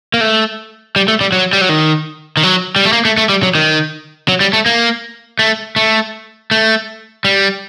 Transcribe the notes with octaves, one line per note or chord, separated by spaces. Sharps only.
A#3
A3
G3
A3
G3
F#3
G3
F#3
D#3
D#3
F#3
G3
A3
A#3
A3
A3
G3
F#3
D#3
F#3
G3
A3
A#3
A3
A3
A3
G3